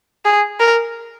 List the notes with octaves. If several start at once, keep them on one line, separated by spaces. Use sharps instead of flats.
G#4
A#4